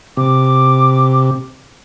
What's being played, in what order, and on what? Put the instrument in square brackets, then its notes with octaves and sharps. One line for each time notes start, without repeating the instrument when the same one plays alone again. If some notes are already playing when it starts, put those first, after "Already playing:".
[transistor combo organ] C3 [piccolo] D6